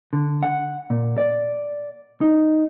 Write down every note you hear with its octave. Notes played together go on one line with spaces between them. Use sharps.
D3
F#5
A#2
D5
D#4